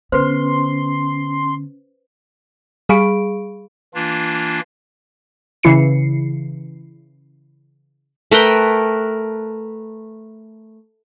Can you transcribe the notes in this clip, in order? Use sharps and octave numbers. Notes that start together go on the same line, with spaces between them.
D3 B3 C#4 B4 C5 C6
G3 G#4 F5 B5 C#6 D7
E3 A#3 D4 F4
C#3 E3 E4 C7 C#7
A3 A#4 B4 G5